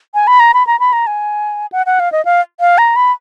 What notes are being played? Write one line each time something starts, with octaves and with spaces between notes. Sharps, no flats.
G#5
B5
A#5
B5
A#5
B5
A#5
G#5
F#5
F#5
F5
D#5
F5
F5
A#5
B5